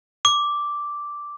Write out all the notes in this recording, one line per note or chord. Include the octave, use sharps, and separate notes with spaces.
D6